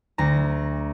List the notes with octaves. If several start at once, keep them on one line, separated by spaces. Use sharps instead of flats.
D2 A#5